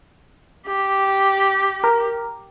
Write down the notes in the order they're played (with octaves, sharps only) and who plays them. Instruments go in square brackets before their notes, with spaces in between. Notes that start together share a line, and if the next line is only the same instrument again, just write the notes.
[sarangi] G4
[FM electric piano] A#4